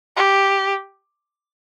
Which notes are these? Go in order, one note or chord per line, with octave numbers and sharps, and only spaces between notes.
G4